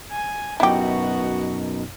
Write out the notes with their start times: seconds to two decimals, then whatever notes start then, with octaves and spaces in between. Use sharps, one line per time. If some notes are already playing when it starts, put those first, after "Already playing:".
0.11 G#5
0.60 F#2 B2 B3 D#4 E4 F#4 G4